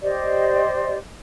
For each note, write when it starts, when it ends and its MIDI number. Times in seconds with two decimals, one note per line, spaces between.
0.01 0.98 67
0.01 0.98 72
0.01 0.98 74
0.01 0.98 75